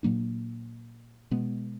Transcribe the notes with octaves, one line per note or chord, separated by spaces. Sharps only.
A#2 F#3 A#3 D4
B2 G#3 B3